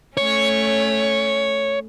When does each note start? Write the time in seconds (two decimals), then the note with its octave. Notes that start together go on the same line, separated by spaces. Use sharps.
0.17 A3 C#4 C#5